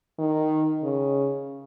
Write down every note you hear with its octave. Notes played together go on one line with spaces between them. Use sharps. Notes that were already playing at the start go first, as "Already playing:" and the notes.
D#3
C#3